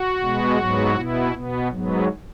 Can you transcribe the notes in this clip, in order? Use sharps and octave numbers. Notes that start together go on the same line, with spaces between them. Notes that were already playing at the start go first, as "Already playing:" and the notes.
Already playing: F#4
B2 G#3 B3
G#2 F#3 B3
B2 B3 E4
B2 B3
G#2 F#3 B3